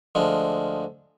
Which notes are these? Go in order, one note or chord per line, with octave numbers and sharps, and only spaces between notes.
D2 F3 G#3 D4